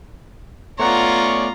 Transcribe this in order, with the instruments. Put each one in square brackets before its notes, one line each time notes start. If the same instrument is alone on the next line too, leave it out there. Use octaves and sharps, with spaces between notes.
[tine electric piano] A3 B3 F#5 [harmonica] C#4 D5 C#6 [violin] F4 A#5